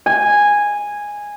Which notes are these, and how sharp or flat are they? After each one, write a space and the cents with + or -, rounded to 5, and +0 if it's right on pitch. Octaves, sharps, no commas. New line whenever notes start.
G#5 -10